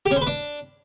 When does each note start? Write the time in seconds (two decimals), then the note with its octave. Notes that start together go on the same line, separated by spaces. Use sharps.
0.06 G4
0.11 C#4
0.16 C5
0.21 B4
0.27 D4